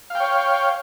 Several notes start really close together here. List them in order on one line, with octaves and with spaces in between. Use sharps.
F5 G5 C#5